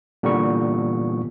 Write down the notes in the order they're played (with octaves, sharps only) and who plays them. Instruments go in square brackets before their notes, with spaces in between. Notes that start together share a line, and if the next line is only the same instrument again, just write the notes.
[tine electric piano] A#2 D3 E3 G3 B3 C#6